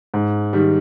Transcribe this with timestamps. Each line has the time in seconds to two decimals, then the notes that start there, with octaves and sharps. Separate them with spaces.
0.14 G#2
0.53 D#3 G3